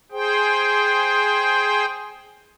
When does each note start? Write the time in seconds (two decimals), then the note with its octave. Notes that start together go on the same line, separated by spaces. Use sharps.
0.12 G#4 C5 G5